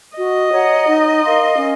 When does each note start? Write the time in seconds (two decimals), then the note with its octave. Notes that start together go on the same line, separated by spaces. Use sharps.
0.17 F#4 D#5
0.52 C#5 F#5 A#5
0.87 D#4
1.22 A#4 F5 C6
1.57 C#4